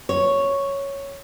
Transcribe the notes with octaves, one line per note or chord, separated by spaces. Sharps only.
C#5